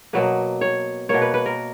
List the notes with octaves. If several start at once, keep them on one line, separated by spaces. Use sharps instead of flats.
B2 F#3 A#3 B4
C#5
B2 A#3 C#5
B4
B4
A#4